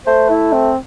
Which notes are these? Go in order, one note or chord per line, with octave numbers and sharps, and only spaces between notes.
A3 C5
E4
C4